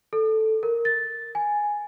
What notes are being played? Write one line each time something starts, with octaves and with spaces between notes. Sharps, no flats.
A4
A#4
A6
G#5